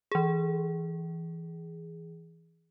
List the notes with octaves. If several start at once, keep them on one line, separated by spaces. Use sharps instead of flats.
E3 G#4